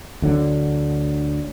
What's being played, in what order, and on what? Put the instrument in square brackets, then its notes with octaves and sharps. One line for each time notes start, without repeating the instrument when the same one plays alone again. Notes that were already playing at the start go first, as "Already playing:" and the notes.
[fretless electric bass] D2 D3 F#3